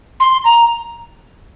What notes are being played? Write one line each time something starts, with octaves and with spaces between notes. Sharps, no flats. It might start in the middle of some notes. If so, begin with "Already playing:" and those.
C6
A#5